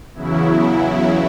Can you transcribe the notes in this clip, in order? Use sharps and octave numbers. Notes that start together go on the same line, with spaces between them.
E2 C#3 F#3 E4